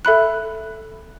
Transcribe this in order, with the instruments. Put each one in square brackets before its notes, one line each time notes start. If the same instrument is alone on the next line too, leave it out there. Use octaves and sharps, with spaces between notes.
[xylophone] A4 E5 B5 F#6